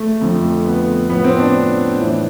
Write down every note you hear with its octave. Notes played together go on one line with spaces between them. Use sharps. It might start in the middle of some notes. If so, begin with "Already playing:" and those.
Already playing: A3
F2 D3 F3
B3
A2 F3 B3
C4
D4
A2 E3